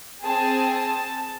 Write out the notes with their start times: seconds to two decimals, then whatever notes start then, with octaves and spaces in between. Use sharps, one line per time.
0.23 C4 G#4 A5
0.72 A5